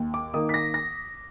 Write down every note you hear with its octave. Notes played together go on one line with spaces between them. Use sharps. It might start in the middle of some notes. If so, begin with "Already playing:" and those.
Already playing: D#2
D6
D#3 A#3 D#4 D#6
B6
A#6
A#6